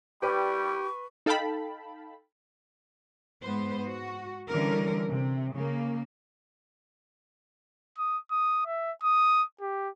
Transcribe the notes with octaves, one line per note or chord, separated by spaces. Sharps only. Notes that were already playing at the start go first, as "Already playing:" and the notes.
G3 G4 B4 C#6
D#4 A4 F5 G5 A5 B5
G#2 B3 B4 C5
F#4
D3 E3 G3 C#4 A#4
C3
C#3 A#3
D#6
D#6
E5
D#6
G4